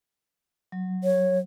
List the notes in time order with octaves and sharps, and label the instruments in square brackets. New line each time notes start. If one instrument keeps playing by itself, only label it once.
[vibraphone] F#3
[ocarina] C#5